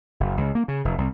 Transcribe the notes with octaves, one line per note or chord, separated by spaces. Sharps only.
F#1
C#2
A#3
C#3
F1
C2